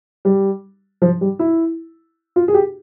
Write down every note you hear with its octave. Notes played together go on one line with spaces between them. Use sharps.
G3
F3
G3
E4
F4
G#4
G4